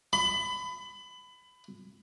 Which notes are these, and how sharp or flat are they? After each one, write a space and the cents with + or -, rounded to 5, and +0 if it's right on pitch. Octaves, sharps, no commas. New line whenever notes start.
B5 +25